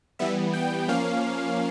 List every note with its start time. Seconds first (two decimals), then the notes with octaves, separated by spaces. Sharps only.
0.19 E3 G3 B3 E5
0.54 G5
0.88 F3 A#3 C#4 F5